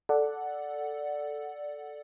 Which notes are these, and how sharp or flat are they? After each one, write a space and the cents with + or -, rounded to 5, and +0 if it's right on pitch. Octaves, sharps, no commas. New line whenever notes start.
A4 +0 D5 +0 F#5 +0